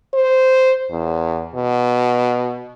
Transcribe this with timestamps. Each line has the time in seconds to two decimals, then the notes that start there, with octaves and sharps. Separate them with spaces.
0.14 C5
0.91 E2
1.54 B2